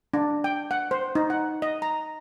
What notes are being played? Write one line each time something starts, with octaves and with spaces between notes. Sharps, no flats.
D4
G5
F#5
C5
D#4
F#5
D#5
A#5